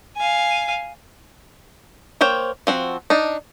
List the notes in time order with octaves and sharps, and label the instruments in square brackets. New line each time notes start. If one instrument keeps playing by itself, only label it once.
[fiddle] F5 G#5
[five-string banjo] A#3 C5 C#5 G5
F3 C4 F#4
D4 D#4